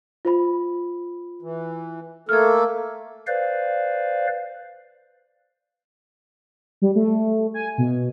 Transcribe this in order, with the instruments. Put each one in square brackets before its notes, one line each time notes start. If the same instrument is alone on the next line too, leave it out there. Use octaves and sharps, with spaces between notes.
[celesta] F4 C5 B5
[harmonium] E3
[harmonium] A3 A#3 A4 [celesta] F6 G#6
[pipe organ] B4 C5 D5 F5
[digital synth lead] G3
A3
G#5
B2